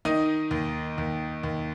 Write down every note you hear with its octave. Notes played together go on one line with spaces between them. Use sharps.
D#3 D#4 D#5
D#2
D#2
D#2